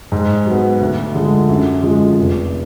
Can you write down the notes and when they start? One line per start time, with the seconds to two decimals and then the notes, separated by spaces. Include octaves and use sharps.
0.12 G#2
0.46 F#3 B3
0.81 D2
1.15 D3 F3 G#3
1.49 F#2
1.83 D3 F3 G#3
2.17 F1